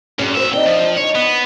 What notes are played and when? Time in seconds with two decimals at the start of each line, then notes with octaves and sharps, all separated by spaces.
0.19 G2 C#4 F#4 G#4
0.35 D#2 F#4 B4 C5 E5
0.53 C4 D4 D#4 G5
0.66 F3
0.97 D#4 C#5
1.15 B3